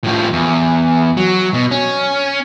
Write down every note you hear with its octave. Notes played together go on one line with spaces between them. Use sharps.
A2 F3
E2
F#3
B2
C#4